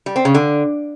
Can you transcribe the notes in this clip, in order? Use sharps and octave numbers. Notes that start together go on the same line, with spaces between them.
G3
C4
C#3
D3